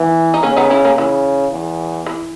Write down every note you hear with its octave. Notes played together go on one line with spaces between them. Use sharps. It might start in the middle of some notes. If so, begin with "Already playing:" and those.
Already playing: E3 B3
D#4
C#3 A#3 C#4
B3 D#4
C#4 E4
A#3 C#4
C#3 E3
E2
E3